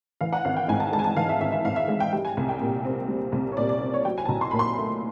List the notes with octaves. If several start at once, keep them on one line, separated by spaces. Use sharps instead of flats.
E3 F5
F#5
G#1 F5
G5
G#2 G#5
A5
G#3 A5
G#5
A5
E3 F5
E5
G#1 E5
E5
G#2 F5
E5
G#3 F5
G5
G3 G5
G#5
C2
G5
A#2
C4
G3
C2
C#5
A#2 D5
D5
C4
C#5
F#3 G5
G#5
A5
B1 A#5
C6
A#2 B5
C6
A3